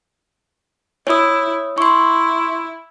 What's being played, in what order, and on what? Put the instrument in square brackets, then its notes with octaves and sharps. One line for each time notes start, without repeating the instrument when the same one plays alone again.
[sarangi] E4 [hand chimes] C#5 D#6
[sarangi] E4 [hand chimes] C6 C#6